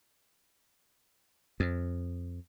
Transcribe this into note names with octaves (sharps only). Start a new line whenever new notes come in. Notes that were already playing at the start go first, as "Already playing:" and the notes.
F2